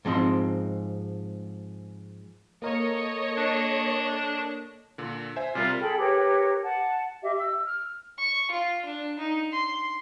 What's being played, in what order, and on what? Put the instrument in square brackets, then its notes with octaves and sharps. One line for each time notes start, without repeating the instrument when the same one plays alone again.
[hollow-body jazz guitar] G#2 F3 C4 D#5 C6
[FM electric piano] A#3 A#4 [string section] A4 C#5 D#5
[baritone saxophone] D4
[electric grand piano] A#2 D3
C5 E5 G#5
[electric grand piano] C3 G3 A#4 [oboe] F4
[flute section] G#4 A4 G5 B5
G4 A#4 B4 C#5
F#5 A5
G4 D#5 E5
E6
F6
[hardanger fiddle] C#6
F4
D4
D#4
C6